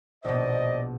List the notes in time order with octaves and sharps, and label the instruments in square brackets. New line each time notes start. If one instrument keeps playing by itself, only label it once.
[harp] A#1 B2 [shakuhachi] C5 [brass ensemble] D5 D#5